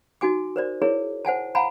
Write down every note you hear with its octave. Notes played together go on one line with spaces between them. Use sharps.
D#4 F#4 G#5 D6
A#4 C5 D5
E4 G#4 A#4 C#5
C5 F#5 G#5 A5
F5 F#5 G#5 A#5 B5